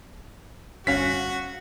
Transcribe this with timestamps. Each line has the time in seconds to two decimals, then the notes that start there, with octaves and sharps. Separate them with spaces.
0.87 G1 C#4 F#4 F5 B6